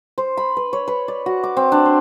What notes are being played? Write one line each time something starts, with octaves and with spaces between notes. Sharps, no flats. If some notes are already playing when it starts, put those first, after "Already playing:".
C5
B5
B4
C#5
B4
D5
F#4
D6
C4
D4
C6